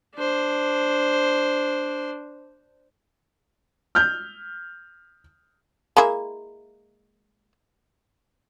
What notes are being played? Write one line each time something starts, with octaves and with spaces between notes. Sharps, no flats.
D4 C5
F6 G6
G#3 A#3 E4